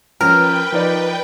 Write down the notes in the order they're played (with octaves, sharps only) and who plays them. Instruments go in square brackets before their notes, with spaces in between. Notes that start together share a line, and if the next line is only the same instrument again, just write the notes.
[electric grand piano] F3 C#4 [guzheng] A#4 [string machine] B4 G5
[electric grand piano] F3 D#4 D5